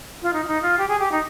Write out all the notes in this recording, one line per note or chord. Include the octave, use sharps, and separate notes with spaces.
F4
D#4
F4
D#4
F4
G4
G#4
G4
D#4